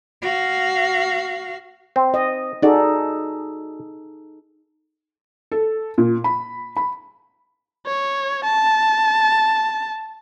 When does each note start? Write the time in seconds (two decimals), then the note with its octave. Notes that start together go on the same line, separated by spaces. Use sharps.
0.22 F#4 F5
1.96 C4
2.14 D#5
2.62 D#4 F#4 G#4 A4 D5
5.52 A4
5.98 A#2
6.24 B5
6.77 B5
7.86 C#5
8.44 A5